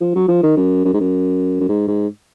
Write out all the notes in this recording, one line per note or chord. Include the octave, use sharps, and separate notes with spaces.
F3
F#3
F3
D#3
F#2
F#2
G#2
F#2
F#2
G#2
G#2